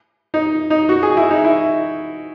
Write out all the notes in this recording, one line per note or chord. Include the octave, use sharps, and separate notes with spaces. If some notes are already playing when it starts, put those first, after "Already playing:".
D#4
D#4
F#4
G#4
E4
D#4
E4